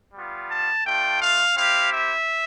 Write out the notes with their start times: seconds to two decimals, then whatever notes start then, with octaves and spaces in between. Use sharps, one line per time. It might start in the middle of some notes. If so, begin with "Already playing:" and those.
0.14 G3 B3 F4
0.50 A5
0.85 A3 D4 F4 G5
1.21 F5
1.56 C4 E4 G4 F5
1.92 E5